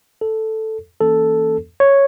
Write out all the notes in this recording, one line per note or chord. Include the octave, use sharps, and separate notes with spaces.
A4
E3 A#3 C#4 A4
C#5